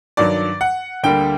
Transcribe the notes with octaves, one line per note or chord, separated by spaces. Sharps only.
G2 D#3 F#3 D5
F#5
D2 D3 G3 A#3 G5